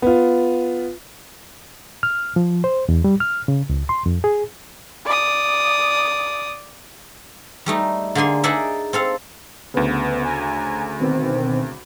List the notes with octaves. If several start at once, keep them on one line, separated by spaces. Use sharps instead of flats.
B3 F4
F6
F3
C5
E2
G3
F6
C#3
C#2
C6
F2
G#4
D5 D#6
G3 A3 D#4
D3 A#3 G#4 G#5 C6
D#4 G#4 A4 D5 E5 F#5
C4 A4 F5
D2 C#3 B3
G#5 A#5
B2 D#3 C4